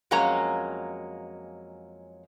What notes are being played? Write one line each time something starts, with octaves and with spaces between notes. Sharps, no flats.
F2 F#3 G#3 A#3 C#4 A#5